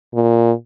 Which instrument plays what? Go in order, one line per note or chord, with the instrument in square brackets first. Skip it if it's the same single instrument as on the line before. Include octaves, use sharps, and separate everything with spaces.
[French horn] A#2